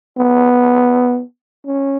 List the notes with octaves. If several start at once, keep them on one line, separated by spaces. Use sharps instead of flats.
B3
C#4